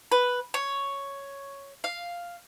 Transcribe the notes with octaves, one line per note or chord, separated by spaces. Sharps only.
B4
C#5
F5